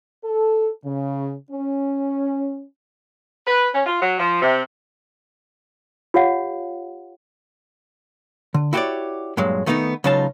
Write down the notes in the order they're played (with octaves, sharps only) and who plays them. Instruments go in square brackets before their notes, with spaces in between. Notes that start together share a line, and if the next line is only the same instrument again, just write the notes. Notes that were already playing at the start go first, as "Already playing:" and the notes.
[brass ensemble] A4
C#3
C#4
[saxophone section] B4
C#4
F4
F#3
F3
C3
[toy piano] F4 G4 C#5 F5 F#5
[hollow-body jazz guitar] D3
E4 F#4 G4 A4 C#5 D5
G2 A#2 F#3 G#3
D#3 A3 B3 D4 D#4
C#2 C#3 F#3 D#4 F4 A5